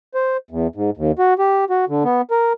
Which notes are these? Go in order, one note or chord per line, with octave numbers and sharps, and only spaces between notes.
C5
E2
G#2
D#2
F#4
G4
F#4
D3
B3
A#4